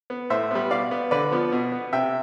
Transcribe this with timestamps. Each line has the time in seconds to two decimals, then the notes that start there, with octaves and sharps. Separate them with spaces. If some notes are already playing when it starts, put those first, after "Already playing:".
0.10 B3
0.30 A2 C5 E5
0.51 G3 B3
0.71 B2 D5 F5
0.91 B3
1.11 D3 B4 D5
1.32 F3 B3
1.52 B2
1.72 B3
1.93 C3 E5 G5